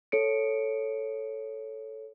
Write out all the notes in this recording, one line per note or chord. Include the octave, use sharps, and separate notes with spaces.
A4 C#5 C#7 D7